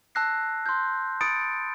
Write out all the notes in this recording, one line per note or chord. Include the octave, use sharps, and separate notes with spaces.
A5 E6 F#6 A#6 C7
C6 G6
B5 D#6 A6 C#7 D7